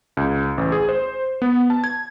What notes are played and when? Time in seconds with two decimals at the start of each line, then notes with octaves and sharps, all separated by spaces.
0.17 C#2
0.58 A1
0.72 G#4
0.89 C5
1.42 B3
1.70 A5
1.84 G#6